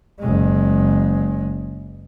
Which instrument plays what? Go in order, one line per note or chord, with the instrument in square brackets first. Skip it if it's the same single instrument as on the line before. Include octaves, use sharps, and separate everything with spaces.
[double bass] F#1 G#3